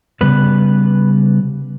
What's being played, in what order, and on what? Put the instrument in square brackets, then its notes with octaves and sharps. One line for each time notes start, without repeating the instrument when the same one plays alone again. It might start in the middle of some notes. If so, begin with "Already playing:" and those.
[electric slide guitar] C#3 G3 B3 B4